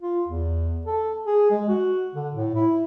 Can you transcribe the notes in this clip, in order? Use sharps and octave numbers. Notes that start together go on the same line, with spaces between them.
F4
E2
A4
G#4
G#3
F#4
D3
A2
E4